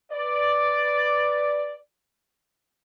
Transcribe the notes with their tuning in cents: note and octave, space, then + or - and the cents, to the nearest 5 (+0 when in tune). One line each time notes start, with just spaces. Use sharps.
B4 +0 D5 +0